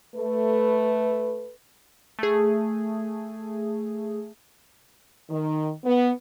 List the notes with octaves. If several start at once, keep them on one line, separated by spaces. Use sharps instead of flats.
A3 B4
A3 G#4
D#3
B3